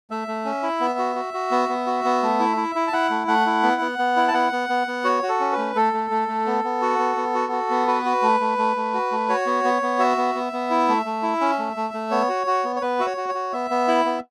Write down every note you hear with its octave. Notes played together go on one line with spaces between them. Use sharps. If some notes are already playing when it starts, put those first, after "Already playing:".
A3 E5
A3
C#4
E4
B3
F#4
F#4
F#4
B3
B3
F#4
B3
A3
E4
E4
E4
A5
E4 F#5
A3
A3 F#5
E4
B3
B3
B3
E4
A5
B3 F#5
B3
B3
B3
F#4 C#5
F#4
A4
C#4
A3 B4
A3 A4
A3
A3
A3
B3
B3
F#4
B3
B3
F#4
F#4
B3
F#4 B4
F#4
A3
A3
A3
A3
F#4
A3
F#4 C#5
B3
B3
B3
F#4 E5
B3
B3
B3
E4
A3
A3
E4
C#4
A3
A3
A3
B3 C#5
F#4
F#4
B3
C#5
B3 B4
F#4 E5
C#5
F#4
C#5
F#4
B3 E5
B3
E4
B3